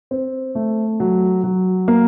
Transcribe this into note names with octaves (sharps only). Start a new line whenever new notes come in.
C4
A3
F#3
F#3
A#3